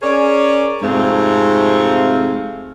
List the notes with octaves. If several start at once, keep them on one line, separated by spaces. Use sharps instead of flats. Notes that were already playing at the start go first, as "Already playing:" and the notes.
C#4 G#4 A#4 C#5 D5
F2 G#2 C3 A3 C4 F5